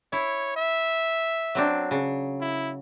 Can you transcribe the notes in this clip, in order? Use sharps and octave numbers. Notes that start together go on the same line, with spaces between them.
E4 C#5
E5
F#3 C4 D4
C#3
E4